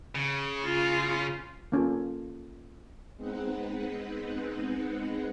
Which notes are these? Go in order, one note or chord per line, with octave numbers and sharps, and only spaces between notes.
C#3
F4
A#3 C#4 F4 A4
G#3 B3 C4 D#4 B4 F#5